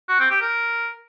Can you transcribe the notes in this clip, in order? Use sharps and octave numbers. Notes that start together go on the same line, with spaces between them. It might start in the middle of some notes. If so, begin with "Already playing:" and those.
F#4
C4
G4
A#4